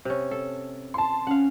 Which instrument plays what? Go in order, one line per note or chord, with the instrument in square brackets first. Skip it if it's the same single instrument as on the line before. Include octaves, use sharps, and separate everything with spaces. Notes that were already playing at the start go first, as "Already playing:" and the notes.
[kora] C3 C#4
A4
[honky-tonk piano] A5 C6
[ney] C#4 [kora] F5 F#5